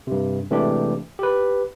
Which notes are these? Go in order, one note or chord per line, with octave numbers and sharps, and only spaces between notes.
G2 C3
C3 E3 G#3 A3 D4 G4
G4 B4